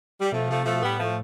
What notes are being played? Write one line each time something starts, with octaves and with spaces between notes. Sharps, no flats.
G3
B2 F3 A3
C3 F3 A3
B2 F3 A3
A2 G3 B3
F3 A3